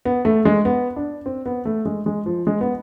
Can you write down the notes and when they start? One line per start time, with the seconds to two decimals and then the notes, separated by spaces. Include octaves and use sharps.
0.05 B3
0.25 A3
0.45 G#3
0.65 B3
0.96 D4
1.26 C4
1.46 B3
1.65 A3
1.85 G#3
2.06 G#3
2.26 F3
2.47 G#3
2.61 B3